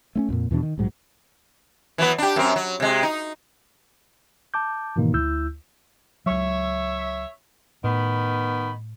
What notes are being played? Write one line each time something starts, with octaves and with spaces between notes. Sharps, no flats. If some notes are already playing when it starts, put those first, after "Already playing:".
A3 C4 C#4
A1 F2 A#2
E2 B2 E3 D4
D#3
A#1 G#2 F#3
E3 F#3 B3
D4 G4
F#2 C4
F#3
C3 G#3
D#4
A5 D6 G6
G#2 B2 D#3 E3 A#3 D#4
D2 E4 E6 G6
C#2 F#3 C#5 E5
A2 D#3 B3 B5